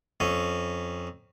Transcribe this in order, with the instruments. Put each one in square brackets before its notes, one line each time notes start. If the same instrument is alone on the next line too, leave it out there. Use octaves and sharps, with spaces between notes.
[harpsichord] F2 C#4